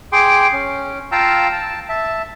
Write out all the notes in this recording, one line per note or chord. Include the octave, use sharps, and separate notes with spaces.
G#4 G5 C6 D6
C#4
F4 F5 G5 A5 A#5 E6
A5
E5 A5